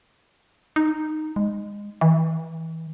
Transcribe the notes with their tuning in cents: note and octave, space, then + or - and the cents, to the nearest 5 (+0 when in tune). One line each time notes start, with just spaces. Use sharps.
D#4 -5
G#3 -20
E3 -25